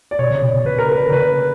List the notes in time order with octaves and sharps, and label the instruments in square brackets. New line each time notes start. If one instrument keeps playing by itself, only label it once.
[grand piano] D5
[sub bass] B2 [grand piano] C#5
[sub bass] C#3
B2
B2
[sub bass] C#3 [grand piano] B4
[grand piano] A#4
B4
[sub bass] D3 [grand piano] A#4
[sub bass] C#3 [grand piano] B4